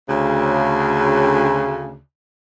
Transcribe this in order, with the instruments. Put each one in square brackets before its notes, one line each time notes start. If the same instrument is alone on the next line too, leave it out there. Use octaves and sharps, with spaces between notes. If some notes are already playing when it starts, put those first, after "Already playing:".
[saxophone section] D2 C#3